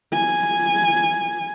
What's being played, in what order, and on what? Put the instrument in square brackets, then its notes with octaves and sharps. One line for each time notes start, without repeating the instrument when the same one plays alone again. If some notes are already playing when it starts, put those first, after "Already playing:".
[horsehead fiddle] G#5